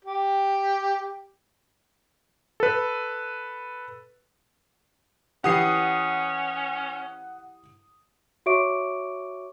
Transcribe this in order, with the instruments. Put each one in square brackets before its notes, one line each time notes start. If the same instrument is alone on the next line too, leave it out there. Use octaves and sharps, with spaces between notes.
[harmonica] G4
[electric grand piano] A4 B4
[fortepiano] E3 G4 [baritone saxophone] C#4 [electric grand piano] F#5 D#6 C7
[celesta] F#4 C#5 E5 C#6 D6 D7